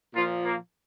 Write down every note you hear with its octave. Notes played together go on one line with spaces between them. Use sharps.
A#2 F3 F4
A#3